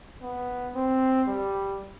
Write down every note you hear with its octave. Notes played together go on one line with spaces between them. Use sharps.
B3
C4
G3